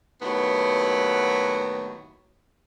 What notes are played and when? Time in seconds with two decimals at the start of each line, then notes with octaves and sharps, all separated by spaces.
0.21 D#2 A2 F#3 B3